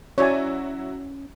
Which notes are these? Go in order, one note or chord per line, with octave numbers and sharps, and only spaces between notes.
F#3 C#4 E4 F#4 C#5 D5 G#5